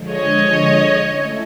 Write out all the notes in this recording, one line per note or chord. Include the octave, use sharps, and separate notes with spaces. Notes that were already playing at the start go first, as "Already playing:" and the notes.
Already playing: D3 F3 G#3
C#5 D#5
A3 C#4 E4 A4